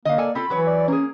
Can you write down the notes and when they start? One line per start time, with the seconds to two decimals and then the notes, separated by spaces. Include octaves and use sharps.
0.05 D3 A#3 D#5 F5
0.18 A4 D5 G#5
0.35 C4 F4 A4 B5
0.50 E3 F#3 B4 C#5
0.67 D5
0.88 A#3 C#4 G#4